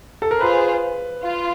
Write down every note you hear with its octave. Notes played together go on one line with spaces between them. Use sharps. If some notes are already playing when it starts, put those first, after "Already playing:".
A4
A#4
F4 G#4 B4 C5
F4